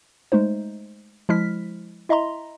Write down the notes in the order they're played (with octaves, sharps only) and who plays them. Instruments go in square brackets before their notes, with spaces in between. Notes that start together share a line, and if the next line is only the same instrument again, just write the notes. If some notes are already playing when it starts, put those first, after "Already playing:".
[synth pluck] G#3 A3 D#4 C5
F3 G#3 E4 F6 B6
E4 D#5 E5 A#5 C6